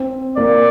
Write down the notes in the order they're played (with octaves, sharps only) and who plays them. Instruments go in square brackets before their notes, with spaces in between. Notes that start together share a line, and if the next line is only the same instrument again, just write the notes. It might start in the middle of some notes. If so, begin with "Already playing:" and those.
Already playing: [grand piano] C4
[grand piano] A#3 [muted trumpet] D5